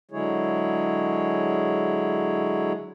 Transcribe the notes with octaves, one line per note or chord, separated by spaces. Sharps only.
D3 F#3 G#3 E4 G#4 C#5